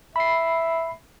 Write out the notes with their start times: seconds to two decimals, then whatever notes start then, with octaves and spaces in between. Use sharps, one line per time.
0.16 E5 B5 C7